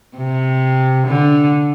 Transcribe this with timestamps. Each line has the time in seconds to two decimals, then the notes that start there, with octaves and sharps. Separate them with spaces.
0.17 C3
1.08 D3